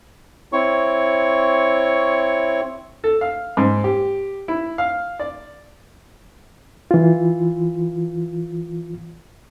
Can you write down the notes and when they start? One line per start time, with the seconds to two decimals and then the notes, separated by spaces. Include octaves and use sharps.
0.53 C4 E4 C#5 C#6
3.04 A4
3.21 F5
3.57 G#2
3.84 G4
4.48 E4
4.78 F5
5.20 D5
6.91 E3 F4